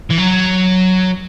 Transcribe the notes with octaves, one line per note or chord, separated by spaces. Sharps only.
E3
F#3